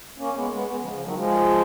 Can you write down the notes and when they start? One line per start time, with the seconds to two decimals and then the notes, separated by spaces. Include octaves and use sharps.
0.18 A#3 C#4
0.35 G#3 B3
0.51 G#3 B3
0.68 G#3 B3
0.80 C#3 F3
0.93 C#3 F3
1.04 D#3 F#3
1.17 F3 G#3